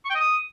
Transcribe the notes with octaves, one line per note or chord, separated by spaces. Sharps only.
C#6
G5
D#5
D#6